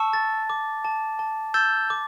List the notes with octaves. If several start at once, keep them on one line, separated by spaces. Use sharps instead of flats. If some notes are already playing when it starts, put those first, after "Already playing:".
Already playing: A5 C#6 E6
A6
D6
A5
A5
E6 G6 A6
D6